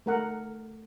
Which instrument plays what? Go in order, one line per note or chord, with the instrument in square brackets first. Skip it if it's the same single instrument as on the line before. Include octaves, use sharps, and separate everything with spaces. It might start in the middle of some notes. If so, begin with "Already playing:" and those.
[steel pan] A3 A#4 F#5